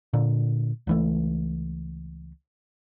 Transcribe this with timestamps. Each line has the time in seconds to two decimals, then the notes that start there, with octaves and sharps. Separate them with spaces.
0.13 A#2 D3
0.87 C#2 E3 A3